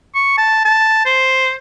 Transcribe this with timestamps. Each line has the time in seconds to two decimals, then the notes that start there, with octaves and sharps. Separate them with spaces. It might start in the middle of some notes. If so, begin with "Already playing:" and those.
0.15 C#6
0.38 A5
0.65 A5
1.06 C5